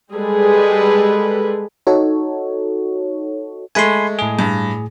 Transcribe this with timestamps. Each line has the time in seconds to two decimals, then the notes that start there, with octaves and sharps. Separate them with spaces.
0.12 G3 G#3 G#4 A4 B4
1.87 D#4 F#4 A4 C#5
3.75 G#3 A3 G#5 B5 C6
4.19 A2 G#4
4.39 G2